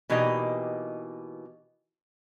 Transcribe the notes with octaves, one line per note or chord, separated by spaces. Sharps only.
B2 E3 A#3 D#4 G4 D#5